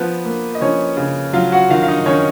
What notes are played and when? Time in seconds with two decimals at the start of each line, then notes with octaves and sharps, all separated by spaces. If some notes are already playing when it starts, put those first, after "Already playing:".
Already playing: F3 B3 B4
0.25 A#3
0.55 D#5
0.61 F3 C#4 C#5
0.97 C#3
1.33 F#3 F4 F5
1.52 F#4 F#5
1.70 D#3 F4 F5
1.83 F5
1.88 D#4 D#5
2.06 D#3 C#4 C#5